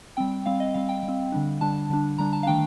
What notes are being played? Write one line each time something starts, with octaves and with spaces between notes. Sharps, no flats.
G3 C4 G5
G3 C4 F5
D#5
G3 C4 F5
G5
G3
C4
D3 G3 D4
D3 G3 D4 A5
D3 G3 D4
D3 G3 D4 A#5
A5
F5
D#3 A3 D4 G5